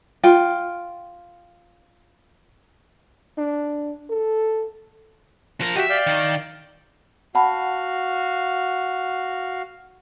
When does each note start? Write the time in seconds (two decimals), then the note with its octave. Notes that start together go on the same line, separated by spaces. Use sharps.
0.23 F4 G5
3.38 D4
4.10 A4
5.61 F3 A#4
5.76 F#4 G4 D#5 E5
5.89 D5 F5 G5
6.07 D#3
7.35 F#4 F5 F#5 A5 B5